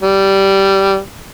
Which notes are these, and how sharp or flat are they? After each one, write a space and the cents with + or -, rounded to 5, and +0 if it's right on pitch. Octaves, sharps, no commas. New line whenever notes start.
G3 -10